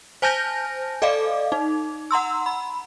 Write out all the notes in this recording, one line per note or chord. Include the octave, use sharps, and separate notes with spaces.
C5 G#5 A5 F6 G6 A#6
A4 D5 D#5 F5 D6
D#4
F#5 A#5 C6 E6
B5